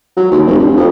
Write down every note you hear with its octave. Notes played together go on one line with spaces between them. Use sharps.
F#3
D#2
F1
G2
F2